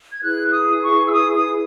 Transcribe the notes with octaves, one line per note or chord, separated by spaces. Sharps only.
G#6
E4 G#4 B4 F#6
D#6
C#6
E6
D#6
D#6